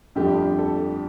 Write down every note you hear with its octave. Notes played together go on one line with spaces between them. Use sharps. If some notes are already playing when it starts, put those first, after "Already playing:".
G1 F2 D3 A3 G4
A4